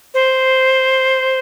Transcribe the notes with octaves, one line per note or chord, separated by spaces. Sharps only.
C5